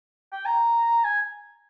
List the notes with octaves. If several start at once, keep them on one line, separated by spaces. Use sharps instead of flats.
G5
A#5
G#5